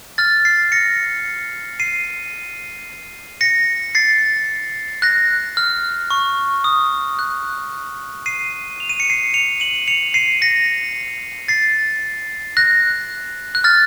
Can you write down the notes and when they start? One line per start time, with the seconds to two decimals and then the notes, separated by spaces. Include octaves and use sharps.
0.18 F6 A6
0.45 A6 C7
0.72 A#6 C#7
1.80 C7 D#7
3.41 A#6 C#7
3.95 A6 C7
5.02 F#6 A#6
5.57 F6
6.10 C#6
6.64 D#6
7.19 F#6
8.26 C7 D#7
8.80 F7
8.90 D#7
9.00 C#7
9.10 C7 D#7
9.34 C#7 F7
9.60 D#7 F#7
9.88 C#7 F7
10.14 C7 D#7
10.41 A#6 C#7
11.48 A6 C7
12.57 F#6 A#6
13.55 F#6
13.64 F6 A6